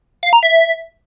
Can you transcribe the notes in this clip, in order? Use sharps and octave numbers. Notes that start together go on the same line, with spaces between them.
F5
A#5
E5